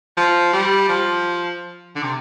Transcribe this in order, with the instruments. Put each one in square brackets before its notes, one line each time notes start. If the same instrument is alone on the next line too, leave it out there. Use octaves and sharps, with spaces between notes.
[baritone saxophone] F3
G3
F3
D3
C3